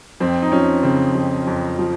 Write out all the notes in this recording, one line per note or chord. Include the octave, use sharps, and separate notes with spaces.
F2 C4
D#4
F3 C#4
C#3 C4
F2
F2
F3